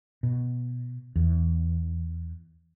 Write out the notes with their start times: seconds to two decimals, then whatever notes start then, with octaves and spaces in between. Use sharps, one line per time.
0.23 B2
1.16 E2